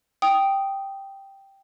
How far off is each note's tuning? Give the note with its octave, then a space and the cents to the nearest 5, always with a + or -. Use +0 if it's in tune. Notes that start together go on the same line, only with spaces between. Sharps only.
G5 +0 D#6 +0